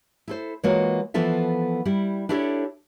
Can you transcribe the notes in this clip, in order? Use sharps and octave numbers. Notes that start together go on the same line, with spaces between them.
E4 A4 C5
E3 G#3 A#3 F4 F#4 C#5
E3 F3 B3 F4 A4 E5
G3 E4 G4
D4 E4 G4 A4 C5 C#5